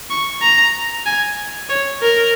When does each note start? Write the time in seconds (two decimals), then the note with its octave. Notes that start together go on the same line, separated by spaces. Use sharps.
0.10 C#6
0.42 A#5
1.06 G#5
1.69 C#5
2.02 A#4